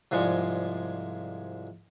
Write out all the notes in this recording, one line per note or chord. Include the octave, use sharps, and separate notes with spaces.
C2 G#2 F3 G#3 D5 C#6